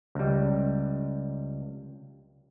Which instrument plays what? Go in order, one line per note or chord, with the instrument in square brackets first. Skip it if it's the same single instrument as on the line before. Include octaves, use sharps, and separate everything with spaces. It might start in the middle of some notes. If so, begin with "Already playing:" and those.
[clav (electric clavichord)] C#2 G3